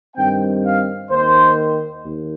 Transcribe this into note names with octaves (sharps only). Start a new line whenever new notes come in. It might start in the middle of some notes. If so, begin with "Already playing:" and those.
G2 D#3 C4 G5
F5
D#2 D#3 A#3 C5
D#2